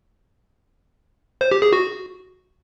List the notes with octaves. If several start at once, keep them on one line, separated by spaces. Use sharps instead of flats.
C5
G4
G#4
F#4